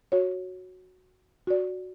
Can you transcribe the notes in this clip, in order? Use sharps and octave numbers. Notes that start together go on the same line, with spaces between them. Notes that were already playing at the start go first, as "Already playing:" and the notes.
F#4 C#5
F#4 D5